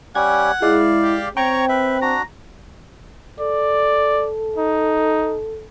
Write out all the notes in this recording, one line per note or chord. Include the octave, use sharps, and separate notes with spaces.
G3 C#4 G4 F#5 G#6
G#3 E4 D5 F5
G4
C4 C#5 G5 A#5 C#6
B4 E5
D4 F#4 A#5
A4 D5
D#4